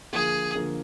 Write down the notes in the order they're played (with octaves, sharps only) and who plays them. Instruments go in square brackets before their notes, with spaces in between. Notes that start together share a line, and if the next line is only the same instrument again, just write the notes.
[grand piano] D3 F3 A#3 [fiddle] G#4
[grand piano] D3 F3 A#3